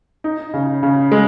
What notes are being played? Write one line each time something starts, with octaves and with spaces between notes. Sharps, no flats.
D#4
C#3
C#3
G#3